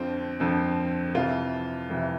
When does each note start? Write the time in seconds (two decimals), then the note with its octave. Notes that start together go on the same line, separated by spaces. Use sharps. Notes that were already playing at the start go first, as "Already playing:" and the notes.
Already playing: F2 D3 F3 C4
0.40 F2 D3 F3
1.15 F2 C3 E3 F4
1.89 F2 C3 E3